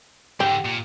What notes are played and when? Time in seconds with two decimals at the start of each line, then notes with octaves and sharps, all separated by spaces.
0.40 G#2 D3 G4 G5
0.65 A#2